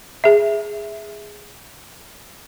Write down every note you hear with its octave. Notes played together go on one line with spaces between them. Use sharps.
G#4 E5